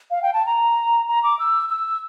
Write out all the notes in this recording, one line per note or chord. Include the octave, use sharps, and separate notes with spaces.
F5
G5
A5
A#5
A#5
D6
E6
E6